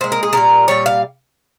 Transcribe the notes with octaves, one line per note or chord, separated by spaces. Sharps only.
A#2 G#3 C5
A#4
G#4
A#2 G3 A#4
A#2 G3 C#5
F5